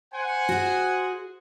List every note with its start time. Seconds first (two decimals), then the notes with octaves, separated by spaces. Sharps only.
0.13 C5 F#5 G#5
0.49 F#4 G#4